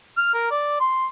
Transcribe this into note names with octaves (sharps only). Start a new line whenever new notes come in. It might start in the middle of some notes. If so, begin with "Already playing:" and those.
F6
A#4
D5
C6